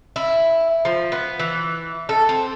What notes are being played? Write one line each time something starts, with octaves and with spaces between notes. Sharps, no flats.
E4
F3
B3
E3
A4
C4